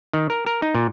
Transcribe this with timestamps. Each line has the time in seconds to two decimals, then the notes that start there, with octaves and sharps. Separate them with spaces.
0.13 D#3
0.30 A#4
0.46 A#4
0.62 D#4
0.75 A#2